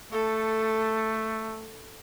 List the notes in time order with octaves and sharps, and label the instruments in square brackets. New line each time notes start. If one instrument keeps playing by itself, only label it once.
[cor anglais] A3 [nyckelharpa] A4